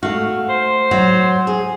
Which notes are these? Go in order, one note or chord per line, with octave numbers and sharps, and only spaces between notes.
A3 F#4 F5
C5
F#3 F#4
G#4